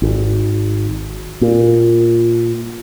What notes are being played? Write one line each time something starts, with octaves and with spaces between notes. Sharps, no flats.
G#1
A#2